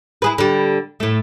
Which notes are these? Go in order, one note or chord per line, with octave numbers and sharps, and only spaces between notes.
E4 G#4 B4
D3 G3
A2 A3